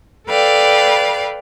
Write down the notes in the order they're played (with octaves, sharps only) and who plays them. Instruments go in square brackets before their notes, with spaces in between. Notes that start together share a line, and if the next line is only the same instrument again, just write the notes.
[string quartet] A4 B4 D5 F5 G5